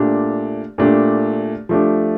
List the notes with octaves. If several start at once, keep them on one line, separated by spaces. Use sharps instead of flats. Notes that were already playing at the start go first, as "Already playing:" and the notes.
Already playing: A#2 A3 D4 G4
A#2 A3 D4 G4
F3 A3 D4 G4